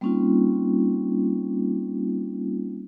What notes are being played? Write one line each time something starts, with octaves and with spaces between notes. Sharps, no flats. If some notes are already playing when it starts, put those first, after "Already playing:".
G3 A#3 C4 C#4 D#4 F4